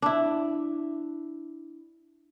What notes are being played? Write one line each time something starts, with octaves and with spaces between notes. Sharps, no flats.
D4 E4